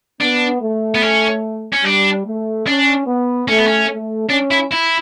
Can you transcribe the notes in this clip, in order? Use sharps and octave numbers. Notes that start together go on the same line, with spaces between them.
B3 D4
A3
B3
C#4
C#4
G3 D4
A3
C#4 D4
B3
A3 C#4
B3
C#4
A3
C#4 D4
E4
E4